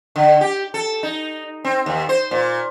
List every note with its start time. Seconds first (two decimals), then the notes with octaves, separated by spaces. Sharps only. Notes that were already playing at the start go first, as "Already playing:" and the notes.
0.16 D3
0.41 G4
0.74 A4
1.03 D#4
1.64 C4
1.86 D#2
2.09 C5
2.31 A#2